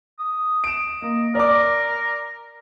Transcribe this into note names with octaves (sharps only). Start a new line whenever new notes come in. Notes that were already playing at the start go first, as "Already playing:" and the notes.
D#6
D7 E7
A#3 D#5
A#4 D5 D6